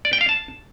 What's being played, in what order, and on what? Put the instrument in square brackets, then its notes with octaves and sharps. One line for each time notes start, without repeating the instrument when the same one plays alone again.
[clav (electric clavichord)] D5
G5
F5
A5